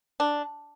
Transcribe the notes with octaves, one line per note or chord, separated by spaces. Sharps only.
D4